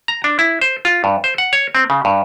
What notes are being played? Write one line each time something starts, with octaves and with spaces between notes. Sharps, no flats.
A#5
D4
E4
C5
F4
G2
C5
F#5
C#5
C4
C#3
G2